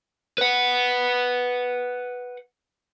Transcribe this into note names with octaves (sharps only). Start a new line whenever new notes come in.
B4 F#5